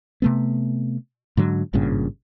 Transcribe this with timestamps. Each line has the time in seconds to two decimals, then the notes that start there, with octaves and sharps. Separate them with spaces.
0.22 C3 A3 B3
1.37 G#2 D3 F#3
1.73 G#1 G2 A#2 C#3